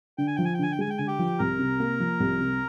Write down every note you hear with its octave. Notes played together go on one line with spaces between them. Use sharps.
D3 G5
G#5
F3 G5
G#5
G5
D3 G#5
G5
G#3 G#5
G5
D3 G#5
G4 G5
F3
C2 A#4 A#5
C3
A#3
F3
C2
C3